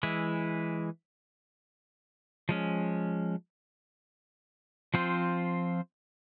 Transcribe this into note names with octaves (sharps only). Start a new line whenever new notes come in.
E3 G#3 E4
F3 G#3 C#4
F3 C4 F4 C5